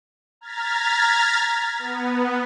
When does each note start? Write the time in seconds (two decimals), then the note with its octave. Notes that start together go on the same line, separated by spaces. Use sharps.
0.41 A#5 F6 G#6 A6 B6
1.79 B3